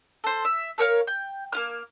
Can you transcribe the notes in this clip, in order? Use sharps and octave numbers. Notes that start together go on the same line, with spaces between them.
A4 C5
E5
A4 A#4 C#5 F5
G5
A#3 F4 F6